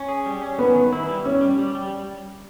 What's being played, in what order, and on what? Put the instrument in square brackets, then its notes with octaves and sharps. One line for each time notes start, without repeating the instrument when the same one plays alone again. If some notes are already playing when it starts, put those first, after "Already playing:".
Already playing: [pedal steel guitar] C#4
G#4
G3
C#4
[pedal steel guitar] D#3 [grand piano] B3
[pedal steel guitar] D#3
E4
G3
[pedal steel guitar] G3 [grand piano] C#4
[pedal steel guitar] G3
G3
G3